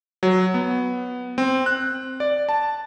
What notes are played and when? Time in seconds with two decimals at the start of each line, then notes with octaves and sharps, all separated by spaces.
0.23 F#3
0.54 B3
1.38 C4
1.66 F#6
2.20 D5
2.49 A5